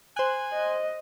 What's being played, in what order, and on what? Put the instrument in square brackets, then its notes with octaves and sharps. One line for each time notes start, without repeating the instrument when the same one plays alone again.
[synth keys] C5 F#6 [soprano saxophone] G#5
[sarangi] D#5